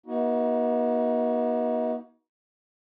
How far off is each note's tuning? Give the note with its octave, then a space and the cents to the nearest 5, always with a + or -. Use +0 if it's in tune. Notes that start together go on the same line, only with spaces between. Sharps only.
B3 -45 D#4 +35 F#4 +15